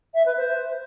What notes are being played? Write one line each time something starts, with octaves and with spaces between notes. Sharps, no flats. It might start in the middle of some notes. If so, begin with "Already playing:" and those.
E5
B4
C5